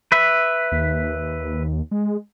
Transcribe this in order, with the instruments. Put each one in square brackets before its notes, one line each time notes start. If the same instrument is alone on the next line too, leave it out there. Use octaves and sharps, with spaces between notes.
[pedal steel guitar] B4 E5
[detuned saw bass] D#2
G#3